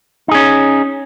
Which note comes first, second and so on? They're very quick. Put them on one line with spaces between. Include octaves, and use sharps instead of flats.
D#4 G#4 C#4